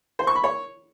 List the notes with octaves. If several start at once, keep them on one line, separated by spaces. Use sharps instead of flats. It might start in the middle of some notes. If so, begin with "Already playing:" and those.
C5
C#6
B5
C#5